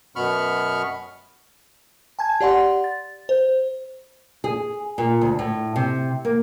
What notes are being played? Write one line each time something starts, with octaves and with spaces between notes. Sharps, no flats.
F#2 B2 B3 B5 C#6 F6
G#5 A5 G#6
G4 D5 F#5 C6
A6
C5
G#4
A#2
D2
A2
C3
A#3